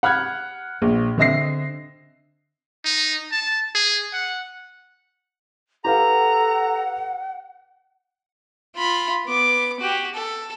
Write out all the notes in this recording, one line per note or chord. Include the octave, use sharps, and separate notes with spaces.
F#5 B5 F6 F#6 G#6
A#1
D3 C4 D#5 E5 A#6 C7
D#4
A5
G#4
F#5
G4 A4 B4 F5 F#5 A#5
F4 B5
B3 D6
F#4 G4
A4